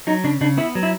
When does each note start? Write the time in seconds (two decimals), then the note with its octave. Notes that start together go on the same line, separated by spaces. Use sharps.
0.07 F#3 D#4
0.24 C#3 D4
0.41 C#3 D4
0.57 B3 E4
0.75 F#3
0.83 E4